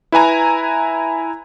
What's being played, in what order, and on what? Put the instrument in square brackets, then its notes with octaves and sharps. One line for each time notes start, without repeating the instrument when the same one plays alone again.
[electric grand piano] E4 B4 G#5 A#5